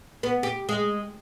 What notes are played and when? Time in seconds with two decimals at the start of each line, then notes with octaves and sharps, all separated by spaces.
0.23 B3
0.43 G4
0.69 G#3